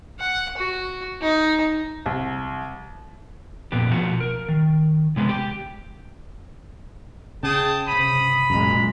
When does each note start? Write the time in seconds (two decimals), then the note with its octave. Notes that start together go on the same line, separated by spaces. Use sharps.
0.20 F#5
0.57 F#4
1.21 D#4
2.06 C2
3.72 F2 A#2 B3 G4
3.89 B2 F3 F#4
4.20 A#4
4.49 D#3
5.16 C3 G#3 B3
5.29 G4
7.43 C#3 G#4 G5 A5 D#6
7.87 G2 C3 B5 D#6
8.50 F#2 A#2 G#3 A#5